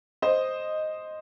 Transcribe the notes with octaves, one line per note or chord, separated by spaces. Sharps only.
C5 D#5